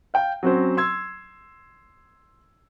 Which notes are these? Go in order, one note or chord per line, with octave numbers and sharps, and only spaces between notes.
F5 G5
F#3 C4 C#4 F#4 C5
C6 E6 G#6